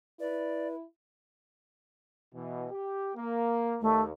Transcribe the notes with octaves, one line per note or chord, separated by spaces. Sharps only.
E4 B4 D5
B2 E3
G4
A#3
D#2 A3